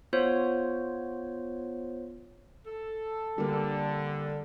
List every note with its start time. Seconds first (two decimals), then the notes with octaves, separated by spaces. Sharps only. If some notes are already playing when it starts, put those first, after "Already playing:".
0.13 B3 F4 C5 C#5
2.65 A4
3.38 D3 G3 A#3